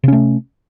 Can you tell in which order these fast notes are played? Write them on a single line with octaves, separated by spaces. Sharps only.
C3 C#4 A3